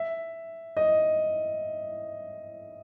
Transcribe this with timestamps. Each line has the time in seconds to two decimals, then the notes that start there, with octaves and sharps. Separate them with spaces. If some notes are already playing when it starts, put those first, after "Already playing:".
Already playing: E5
0.77 D#5